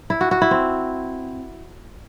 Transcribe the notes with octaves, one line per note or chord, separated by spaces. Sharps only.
E4
F#4
F#4
E4
C4